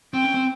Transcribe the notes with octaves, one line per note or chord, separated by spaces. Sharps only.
C4 G5
C#4
C4